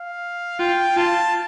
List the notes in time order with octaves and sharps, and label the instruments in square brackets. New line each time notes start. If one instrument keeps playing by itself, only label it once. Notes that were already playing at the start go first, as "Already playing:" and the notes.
Already playing: [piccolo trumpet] F5
[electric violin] F4 [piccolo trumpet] G5
[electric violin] F4 [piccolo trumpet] A5